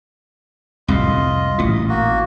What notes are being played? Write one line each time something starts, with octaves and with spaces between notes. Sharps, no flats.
C2 F2 A2 F4 D#5
A1 A#2 D#6
A#3 F#4